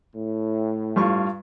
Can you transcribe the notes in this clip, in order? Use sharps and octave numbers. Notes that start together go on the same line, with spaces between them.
A2
G2 F4 C#6